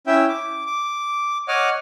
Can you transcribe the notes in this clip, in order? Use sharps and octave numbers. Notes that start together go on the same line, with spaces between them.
C#4 E4 E5 G5
D6
D6
C#5 D#5 F#5 D6 D#6 F6